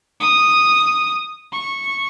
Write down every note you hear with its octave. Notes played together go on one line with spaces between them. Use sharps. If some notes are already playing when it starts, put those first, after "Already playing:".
D#6
C#6